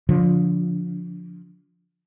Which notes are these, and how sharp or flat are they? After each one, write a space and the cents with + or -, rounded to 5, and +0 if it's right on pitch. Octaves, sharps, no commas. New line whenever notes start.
D3 -25 F3 +10